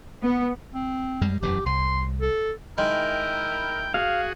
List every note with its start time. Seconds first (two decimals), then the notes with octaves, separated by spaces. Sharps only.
0.23 B3
0.74 C4
1.21 F#2 G3 G#3
1.42 E1 F#2 E3 G4
1.66 C2 C6
2.21 A4
2.78 D#3 G#3 E4 A#4 G5
3.94 F#4 G#4 F5